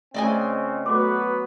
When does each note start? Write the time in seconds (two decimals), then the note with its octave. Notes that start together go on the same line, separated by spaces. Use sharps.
0.14 C#2 C#3 A3 C4 D5 D#5 G#5
0.86 F#3 A3 B3 F#4 A4 B4 C6 D6